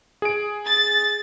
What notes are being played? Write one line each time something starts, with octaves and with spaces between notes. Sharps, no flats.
G#4 D7
A6